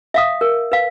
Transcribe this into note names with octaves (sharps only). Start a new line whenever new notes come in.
E5 F5 D#6
A#4
B4 F5